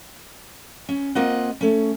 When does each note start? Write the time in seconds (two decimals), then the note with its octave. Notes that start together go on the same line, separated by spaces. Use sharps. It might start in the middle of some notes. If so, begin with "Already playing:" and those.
0.89 C#4
1.15 A#3 C4 F4 D#5 F#5
1.61 A3 C#4